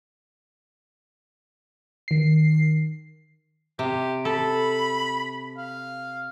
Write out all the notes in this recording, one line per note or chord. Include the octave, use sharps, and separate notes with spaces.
D#3 C7
C3 G4
A4 B5
F5